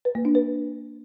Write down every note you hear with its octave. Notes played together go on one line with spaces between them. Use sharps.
B4
A#3
D4
B4